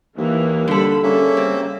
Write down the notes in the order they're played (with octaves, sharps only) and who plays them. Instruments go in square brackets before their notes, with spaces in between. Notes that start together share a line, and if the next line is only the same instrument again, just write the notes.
[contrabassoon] D#2 [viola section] E3 A#3
[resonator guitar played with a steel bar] D3 A4 [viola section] G3 B5
[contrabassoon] C#3 [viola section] G3 [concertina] A#3 C#4 E5
[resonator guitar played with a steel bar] C4